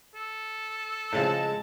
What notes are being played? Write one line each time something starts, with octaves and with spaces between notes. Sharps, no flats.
A4
A2 C#3 F3 G#3 A5